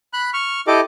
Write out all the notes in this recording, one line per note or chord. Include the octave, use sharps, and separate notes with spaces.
B5 F#6
C#6 F6
E4 G4 A4 D#5 D6